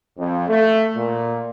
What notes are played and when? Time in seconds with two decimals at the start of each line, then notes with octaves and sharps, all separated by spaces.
0.18 F2
0.49 A3
0.96 A#2